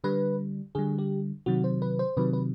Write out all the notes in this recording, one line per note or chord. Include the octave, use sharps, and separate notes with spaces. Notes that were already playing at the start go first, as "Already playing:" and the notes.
D3 G3 B4
D3 G3 G#4
G4
C3 D#3 F#3 F#4
C5
B4
C5
C3 D#3 F#3 B4
B4